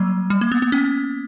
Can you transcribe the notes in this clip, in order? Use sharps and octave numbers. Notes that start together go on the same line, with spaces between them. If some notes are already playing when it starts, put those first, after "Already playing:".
Already playing: F#3 G3 A#3
G3
A#3
B3
B3
C#4